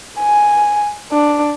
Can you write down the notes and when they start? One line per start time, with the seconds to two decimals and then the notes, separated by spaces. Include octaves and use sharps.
0.19 G#5
1.12 D4